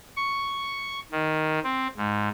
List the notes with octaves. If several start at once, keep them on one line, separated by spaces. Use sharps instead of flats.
C#6
D#3
C4
G#2